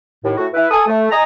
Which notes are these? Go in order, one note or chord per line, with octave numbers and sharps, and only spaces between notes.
D#2 A2
A2 F#4
E4 B4
A4 G#5 D#6
A3
D#5 G#5 A#5